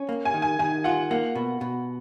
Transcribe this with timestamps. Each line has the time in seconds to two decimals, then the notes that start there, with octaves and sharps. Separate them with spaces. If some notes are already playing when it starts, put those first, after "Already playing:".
Already playing: C#4
0.09 A#3
0.25 G#5
0.34 D#3
0.42 G#5
0.59 D#3 G#5
0.84 F4 F#5
1.11 A#3 F#5
1.35 B2
1.61 B2